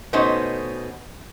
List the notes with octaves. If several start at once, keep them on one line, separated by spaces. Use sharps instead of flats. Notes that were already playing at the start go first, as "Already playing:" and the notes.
B2 A3 B3 C#4 D#4 C5